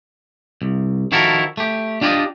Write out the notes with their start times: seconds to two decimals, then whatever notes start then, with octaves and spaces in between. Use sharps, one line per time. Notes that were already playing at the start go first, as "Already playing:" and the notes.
0.62 C2
1.12 D#3 F3 E4 F#4 A4 A#4
1.57 A3 G4
2.01 D4 F4 G4 C5 D5 D#5